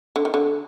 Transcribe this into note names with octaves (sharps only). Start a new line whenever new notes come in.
D3
D#3
D3